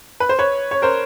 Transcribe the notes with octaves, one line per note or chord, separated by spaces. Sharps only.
B4
C5
B4 C#5
C#5
A#4 C5